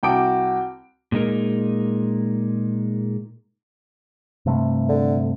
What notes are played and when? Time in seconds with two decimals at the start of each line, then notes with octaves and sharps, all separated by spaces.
0.03 C2 F#4 G5 A5 D6 D7
1.12 A#2 G#3 D#4 A#4
4.46 G2 C3 A3
4.89 D3